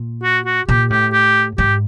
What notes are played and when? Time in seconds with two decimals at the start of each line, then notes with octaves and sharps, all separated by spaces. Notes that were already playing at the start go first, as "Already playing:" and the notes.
Already playing: A#2
0.23 F#4
0.45 F#4
0.68 A#2 G4
0.90 A2 G4
1.12 G4
1.58 G#2 G4